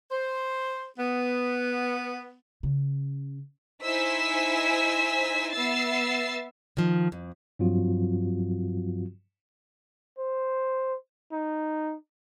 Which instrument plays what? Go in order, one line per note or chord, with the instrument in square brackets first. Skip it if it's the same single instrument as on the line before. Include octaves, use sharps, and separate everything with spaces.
[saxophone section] C5
B3
[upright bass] C#3
[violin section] D#4 E4 C5 G#5 E6 B6
B3 E5 E6 A6 C7
[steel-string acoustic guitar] D#3 F3
F2
[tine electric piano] G2 F3 F#3 C4 F4 F#4
[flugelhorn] C5
D#4